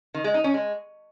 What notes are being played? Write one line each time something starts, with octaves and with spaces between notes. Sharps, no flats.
D#3
G#3
D#4
C#4
G#3